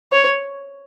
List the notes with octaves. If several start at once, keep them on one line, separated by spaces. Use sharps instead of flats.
C#5